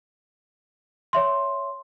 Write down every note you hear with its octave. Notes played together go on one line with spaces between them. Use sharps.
C#5 E5 C6